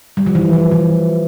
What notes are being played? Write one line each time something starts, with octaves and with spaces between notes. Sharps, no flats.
G3
F3
E3
F3
E3